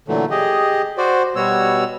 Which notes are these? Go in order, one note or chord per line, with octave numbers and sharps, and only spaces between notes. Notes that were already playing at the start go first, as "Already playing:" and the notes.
A#2 D3 E3 F#3 A3
G4 G#4 D#5
F#4 C5 D5
B2 G3 B3 F#4 C#5 E6